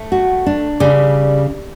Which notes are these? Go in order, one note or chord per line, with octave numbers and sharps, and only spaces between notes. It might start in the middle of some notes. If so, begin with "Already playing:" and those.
Already playing: A3
F#4
D4
C#3 G3